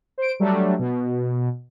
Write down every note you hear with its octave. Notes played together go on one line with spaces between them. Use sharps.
C5 D7
F#3 G3 A3 D4
B2